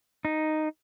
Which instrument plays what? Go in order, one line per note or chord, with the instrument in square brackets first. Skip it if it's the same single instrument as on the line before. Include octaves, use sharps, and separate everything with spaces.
[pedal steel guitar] D#4